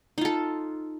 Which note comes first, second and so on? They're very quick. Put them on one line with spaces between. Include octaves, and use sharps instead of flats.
D#4 F4 A4